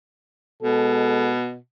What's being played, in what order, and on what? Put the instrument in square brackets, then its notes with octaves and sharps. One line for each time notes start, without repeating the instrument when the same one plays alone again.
[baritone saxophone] B2 [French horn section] G#3 A4